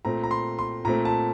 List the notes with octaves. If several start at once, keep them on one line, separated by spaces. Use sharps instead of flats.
A#2 A3 C4 A#5
A#5
C6
C6
A#2 A3 C4 A#5
A5